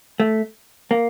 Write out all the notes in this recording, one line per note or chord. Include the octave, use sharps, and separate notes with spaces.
A3
A#3